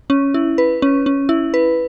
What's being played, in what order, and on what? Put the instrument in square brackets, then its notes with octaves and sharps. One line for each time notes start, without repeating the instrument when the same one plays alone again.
[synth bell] C#4
E4
B4
C#4
C#4
E4
B4